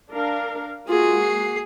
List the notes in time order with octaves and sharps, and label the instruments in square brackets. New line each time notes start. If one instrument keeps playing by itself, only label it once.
[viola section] D4 A#4 F5
[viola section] G#3 A#3 F#4 [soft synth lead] F4 [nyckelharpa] G#4
[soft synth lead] C7